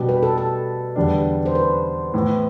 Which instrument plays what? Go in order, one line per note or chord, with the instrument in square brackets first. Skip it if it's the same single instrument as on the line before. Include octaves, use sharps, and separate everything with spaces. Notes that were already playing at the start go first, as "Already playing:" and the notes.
Already playing: [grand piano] B2 G3 D4 G4
[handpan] B4
A4
A4
[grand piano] E2 D3 G3 D4
[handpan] C5
B4
[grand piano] A2 E3 B3 E4